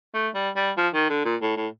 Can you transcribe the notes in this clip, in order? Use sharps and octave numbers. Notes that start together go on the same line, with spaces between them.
A3
G3
G3
F3
D#3
D3
A#2
A2
A2